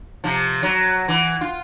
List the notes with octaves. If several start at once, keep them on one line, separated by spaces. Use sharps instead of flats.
C3 F3
F#3
E3
F4